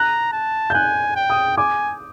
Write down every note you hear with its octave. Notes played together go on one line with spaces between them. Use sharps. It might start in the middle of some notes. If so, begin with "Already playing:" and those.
Already playing: A#5 F#6
A5
G6
G#5 F#6
G5
D#6
G#5 D6